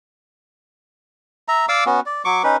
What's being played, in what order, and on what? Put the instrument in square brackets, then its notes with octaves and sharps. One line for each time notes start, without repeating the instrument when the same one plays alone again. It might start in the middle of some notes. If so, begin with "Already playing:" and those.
[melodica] E5 A#5
D5 F5 D6 E6
B3 C#4 F#4
D5
F#3 C#6 D6
C#4 D#4 B4